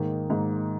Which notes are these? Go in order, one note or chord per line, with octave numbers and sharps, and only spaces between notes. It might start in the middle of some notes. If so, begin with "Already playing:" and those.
Already playing: G#2 D#3 A#3
G#2 D#3 A#3